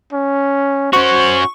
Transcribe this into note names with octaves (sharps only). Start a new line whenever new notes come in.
C#4
C#4 F#4 C5 C#6